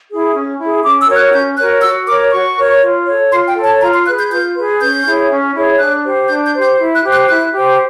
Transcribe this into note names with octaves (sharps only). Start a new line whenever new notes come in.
E4 G#4
C#4
E4 G#4
C#4 D6
E6
F#4 A#4 C#5
F#6
C#4 G6
F#4 A#4 C#5 F#6
F#4 E6
A#4 C#5 D6
F#4 C#6
A#4 C#5
F4
A4 C#5
F4 C6
G5
A4
C#5 A5
F4 A#5
C6
G#4 B4 F#6
G6
F4 G6
G#4 B4
C#4 G6
E4 G#4 C#5
C#4
E4 G#4 C#5
D4 F#6
G4 C5
D4 G6
G6
G4 C5
G6
E4
F#6
G4 C5
F#6
E4 F#6
G4 C5